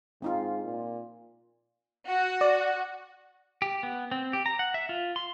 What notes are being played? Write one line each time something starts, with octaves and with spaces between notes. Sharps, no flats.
G#2 C4 D#4 F4
A#2
F#4
D5
G4
B3
C4
G4
A#5
F#5
E5
F4
C6